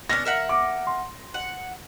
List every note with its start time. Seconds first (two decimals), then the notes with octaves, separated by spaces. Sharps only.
0.09 B3 C#4 D4 A#6
0.25 A#4 E5 F#5
0.49 D6
0.87 C6
1.34 F#5